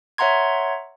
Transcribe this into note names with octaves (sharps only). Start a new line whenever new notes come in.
C#5 E5 F#5 A#5 C6 G#6